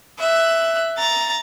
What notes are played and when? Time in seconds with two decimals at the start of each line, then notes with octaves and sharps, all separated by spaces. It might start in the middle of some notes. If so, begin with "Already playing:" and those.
0.19 E5 F#6
0.98 A#5 A6